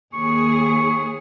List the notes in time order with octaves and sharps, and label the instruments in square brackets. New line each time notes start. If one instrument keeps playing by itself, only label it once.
[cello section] D#2 G#4 [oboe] C#6